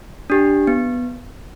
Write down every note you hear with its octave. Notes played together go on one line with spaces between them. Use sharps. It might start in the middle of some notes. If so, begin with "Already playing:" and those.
D4 G4
B3